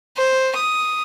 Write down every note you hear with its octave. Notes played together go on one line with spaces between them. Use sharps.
C5
D#6